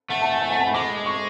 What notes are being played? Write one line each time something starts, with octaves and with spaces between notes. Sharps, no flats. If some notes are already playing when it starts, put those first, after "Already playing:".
A3 F#5
A5
G#5
F#5
G#5
A5
B5
G#3 D6
C#6